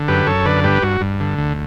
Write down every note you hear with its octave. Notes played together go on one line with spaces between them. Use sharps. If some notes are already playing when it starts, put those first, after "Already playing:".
Already playing: D3
F#2 G4 B4
F#2 A4 C#5
D3 B4 D5
G2 G4 B4
G2 F#4
G2
D3
D2